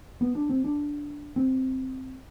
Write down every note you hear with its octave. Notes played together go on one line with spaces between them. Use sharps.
B3
D4
C4
D4
C4